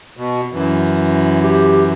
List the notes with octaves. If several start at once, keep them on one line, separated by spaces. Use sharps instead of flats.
B2
F#2 E3
G4